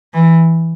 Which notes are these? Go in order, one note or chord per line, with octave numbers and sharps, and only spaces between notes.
E3